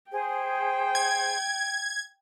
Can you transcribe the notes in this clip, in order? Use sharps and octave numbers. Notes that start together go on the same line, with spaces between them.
G#4 C5 G5
G#6